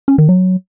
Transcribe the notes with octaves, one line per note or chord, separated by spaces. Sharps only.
C#4
D#3
F#3